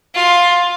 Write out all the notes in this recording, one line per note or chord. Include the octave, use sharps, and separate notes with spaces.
F4